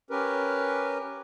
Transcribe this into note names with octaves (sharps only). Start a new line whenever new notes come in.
C#4 G4 A#4 B4